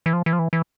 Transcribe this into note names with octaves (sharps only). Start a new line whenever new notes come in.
E3
F3
E3
F3
E3
E3